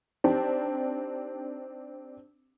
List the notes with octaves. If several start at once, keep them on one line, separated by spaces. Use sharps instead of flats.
C4 D4 D#4 G4 A5